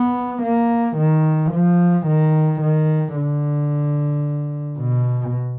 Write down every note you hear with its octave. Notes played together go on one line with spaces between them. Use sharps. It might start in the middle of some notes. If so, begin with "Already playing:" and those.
Already playing: B3
A#3
D#3
F3
D#3
D#3
D3
B2